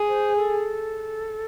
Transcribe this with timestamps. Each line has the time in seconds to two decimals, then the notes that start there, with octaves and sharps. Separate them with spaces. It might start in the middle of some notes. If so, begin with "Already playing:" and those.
Already playing: G#4
0.09 C5
0.36 A4